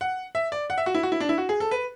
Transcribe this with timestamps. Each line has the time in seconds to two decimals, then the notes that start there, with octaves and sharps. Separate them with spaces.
0.01 F#5
0.35 E5
0.52 D5
0.70 F#5
0.78 E5
0.86 F#4
0.95 E4
1.03 F#4
1.12 E4
1.20 D4
1.29 E4
1.38 F#4
1.49 G#4
1.60 A4
1.71 B4